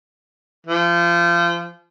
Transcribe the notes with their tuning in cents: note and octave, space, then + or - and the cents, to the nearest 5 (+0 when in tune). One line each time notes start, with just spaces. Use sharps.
F3 -30